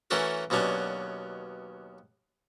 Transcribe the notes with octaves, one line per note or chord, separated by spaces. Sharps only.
E3 A3 C#4 F#4 A4 A#4
D#2 B2 F#3 C#4 D4